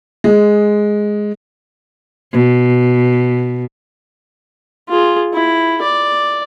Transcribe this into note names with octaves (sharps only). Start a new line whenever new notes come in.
G#3
B2
F4 G#4
E4
D5